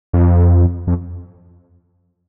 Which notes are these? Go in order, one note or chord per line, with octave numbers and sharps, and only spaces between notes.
F2
F2